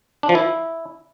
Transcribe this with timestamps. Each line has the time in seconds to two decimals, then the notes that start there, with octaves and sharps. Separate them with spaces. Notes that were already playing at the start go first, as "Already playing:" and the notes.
0.23 D4
0.29 F3
0.35 E4